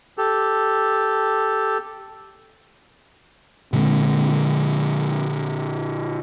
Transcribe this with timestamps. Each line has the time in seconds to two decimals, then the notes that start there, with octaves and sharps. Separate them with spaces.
0.18 G4 A4
3.73 A#2 D3 G#3 C4